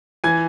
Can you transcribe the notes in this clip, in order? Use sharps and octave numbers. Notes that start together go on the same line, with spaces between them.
E3 G#5 G#6